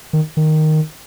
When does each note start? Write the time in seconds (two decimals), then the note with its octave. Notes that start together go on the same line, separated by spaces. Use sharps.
0.13 D#3
0.37 D#3